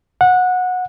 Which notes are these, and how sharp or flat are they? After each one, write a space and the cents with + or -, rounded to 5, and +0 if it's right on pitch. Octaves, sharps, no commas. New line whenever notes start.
F#5 -20